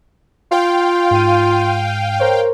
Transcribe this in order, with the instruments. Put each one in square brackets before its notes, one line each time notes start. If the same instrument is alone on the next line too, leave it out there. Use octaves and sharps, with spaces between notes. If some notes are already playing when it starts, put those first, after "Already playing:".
[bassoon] F4 [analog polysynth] F5 G5
[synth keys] G#2 D#7
A#4 C5 C#5